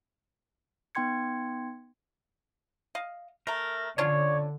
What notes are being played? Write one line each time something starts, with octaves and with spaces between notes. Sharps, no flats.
B3 D#4 G5 C6 G#6 C#7
D#5 F5
A3 A#4 A#5
D3 C#4 D4 F4 C#5 D5